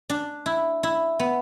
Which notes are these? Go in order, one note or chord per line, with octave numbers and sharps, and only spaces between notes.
D4
E4
E4
B3